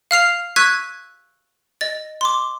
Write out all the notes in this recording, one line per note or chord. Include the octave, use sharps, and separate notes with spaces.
F5 F6 C7 F7
C#6 E6 F#6 G#6 B6 D#7
D#5 A6
C6 D6